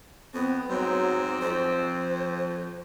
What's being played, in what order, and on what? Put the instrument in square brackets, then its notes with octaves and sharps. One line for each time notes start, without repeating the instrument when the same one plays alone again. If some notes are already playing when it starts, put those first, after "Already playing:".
[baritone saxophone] F2 [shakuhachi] B3 [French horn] C4
[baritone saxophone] G#2 [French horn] F#3 [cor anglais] C4
[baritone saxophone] F2 [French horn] F3 [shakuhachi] C5